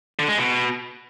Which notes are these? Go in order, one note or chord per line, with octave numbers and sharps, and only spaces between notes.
D3
G#3
B2